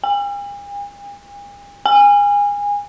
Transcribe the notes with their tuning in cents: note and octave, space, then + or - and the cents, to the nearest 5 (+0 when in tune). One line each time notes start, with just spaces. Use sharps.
G#5 -45
G#5 -25